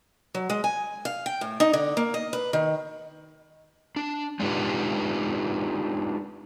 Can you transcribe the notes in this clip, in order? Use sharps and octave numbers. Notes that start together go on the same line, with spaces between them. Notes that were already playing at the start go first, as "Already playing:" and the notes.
F#3
G#3
G#5
F5
G5
A2
D#4
D3
A#3
D#5
B4
D#3
D4
G#3 D4 D#4 F4 G4 B4